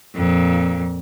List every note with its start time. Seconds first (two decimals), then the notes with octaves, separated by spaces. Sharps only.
0.15 F2 A#2